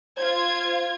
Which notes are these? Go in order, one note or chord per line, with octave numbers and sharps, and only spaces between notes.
F4 C5 G#6